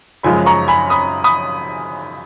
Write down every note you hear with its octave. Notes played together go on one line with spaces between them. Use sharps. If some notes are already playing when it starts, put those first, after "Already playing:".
F#2 C#3 F3 G#3 G#5 B5
A#5 C#6
G#5 B5
B5 D#6
B5 D#6